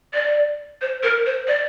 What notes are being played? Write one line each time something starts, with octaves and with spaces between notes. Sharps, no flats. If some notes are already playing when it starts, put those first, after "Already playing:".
D5
C5
A#4
C5
D5